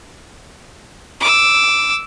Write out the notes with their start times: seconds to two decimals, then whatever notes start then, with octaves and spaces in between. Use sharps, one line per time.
1.21 D6 E6